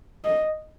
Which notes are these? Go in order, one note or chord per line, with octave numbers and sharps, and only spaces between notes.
D#5